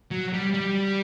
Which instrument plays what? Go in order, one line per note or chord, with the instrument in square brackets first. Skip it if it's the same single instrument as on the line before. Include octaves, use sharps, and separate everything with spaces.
[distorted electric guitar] F#3
G3
G3